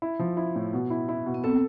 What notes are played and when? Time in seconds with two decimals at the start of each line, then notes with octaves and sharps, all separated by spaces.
0.02 E4
0.19 F3
0.37 E4
0.55 A2
0.73 B2
0.90 E4
1.09 E4
1.26 B2
1.34 B3
1.44 C4 A4